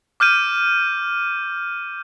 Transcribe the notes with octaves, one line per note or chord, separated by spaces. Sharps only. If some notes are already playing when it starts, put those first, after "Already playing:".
D6 F6 G6 D#7